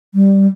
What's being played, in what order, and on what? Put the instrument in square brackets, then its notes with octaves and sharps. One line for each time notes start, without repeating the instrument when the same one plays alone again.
[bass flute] G3